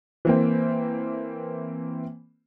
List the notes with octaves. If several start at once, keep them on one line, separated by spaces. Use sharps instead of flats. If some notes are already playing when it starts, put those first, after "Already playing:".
E3 A#3 C4